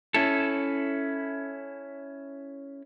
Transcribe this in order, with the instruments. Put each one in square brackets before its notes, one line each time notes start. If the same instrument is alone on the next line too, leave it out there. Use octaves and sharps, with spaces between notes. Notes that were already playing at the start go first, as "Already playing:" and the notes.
[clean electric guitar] C#4 E4 A4